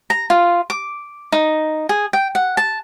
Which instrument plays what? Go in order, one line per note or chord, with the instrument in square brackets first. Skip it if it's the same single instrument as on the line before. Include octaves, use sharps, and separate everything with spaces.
[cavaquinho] A#5
F4
D6
D#4
G#4
G5
F#5
A5